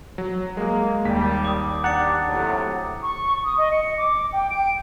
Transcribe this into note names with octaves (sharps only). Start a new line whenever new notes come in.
F#3
G#3 A#3 G#4
D#2 G3 B6
D6 D#6
D4 G4 F#5 A#5 A6 C#7
A2 C3 F#3
C#6
D#6
D#5
C#7
D6
G5
D7